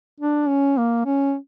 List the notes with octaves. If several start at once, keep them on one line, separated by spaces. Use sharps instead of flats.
D4
C#4
A#3
C#4